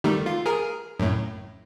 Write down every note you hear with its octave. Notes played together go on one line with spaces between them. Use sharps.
D#3 G3 A3
F4
G#4 A#4
F#2 A2